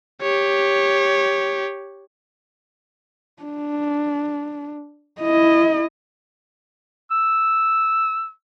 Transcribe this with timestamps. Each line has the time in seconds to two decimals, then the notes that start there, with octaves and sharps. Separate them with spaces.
0.21 G4 C#5
3.43 D4
5.21 E4 D#5
7.11 E6